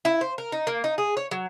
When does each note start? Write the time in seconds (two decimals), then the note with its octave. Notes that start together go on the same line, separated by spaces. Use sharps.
0.05 E4
0.21 C5
0.38 A#4
0.52 D#4
0.67 A#3
0.84 D#4
0.98 G#4
1.17 C#5
1.31 F#3